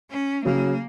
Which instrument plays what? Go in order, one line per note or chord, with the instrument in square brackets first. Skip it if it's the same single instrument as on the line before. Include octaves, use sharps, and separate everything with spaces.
[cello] C#4
[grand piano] C#3 F#3 [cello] A#3